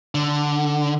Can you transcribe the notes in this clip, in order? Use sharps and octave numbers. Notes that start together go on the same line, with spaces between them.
D3